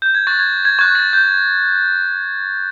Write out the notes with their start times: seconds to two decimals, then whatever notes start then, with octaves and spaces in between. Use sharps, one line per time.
0.02 G6
0.15 G#6
0.27 C#6 F#6 A6
0.39 G#6
0.65 G#6
0.79 C#6 F#6 G#6
0.95 A6
1.13 G6